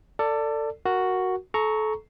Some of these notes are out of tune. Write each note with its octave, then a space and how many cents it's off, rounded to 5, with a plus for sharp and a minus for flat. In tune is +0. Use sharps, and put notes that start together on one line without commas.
A4 +25 D5 +0
F#4 +0 A#4 +0
A4 -30 A#5 +0 C#6 +5